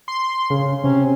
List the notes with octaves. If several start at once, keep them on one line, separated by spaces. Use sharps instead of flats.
C6
C#3
C3 C#4